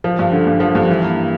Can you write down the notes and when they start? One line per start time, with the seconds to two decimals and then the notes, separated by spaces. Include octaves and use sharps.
0.04 F3
0.19 G2
0.33 D3
0.47 G2
0.60 F3
0.75 G2
0.90 E3
1.04 A#3